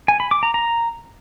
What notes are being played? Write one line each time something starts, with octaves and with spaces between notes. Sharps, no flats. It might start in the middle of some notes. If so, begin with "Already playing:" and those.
G#5
B5
D6
A#5
A#5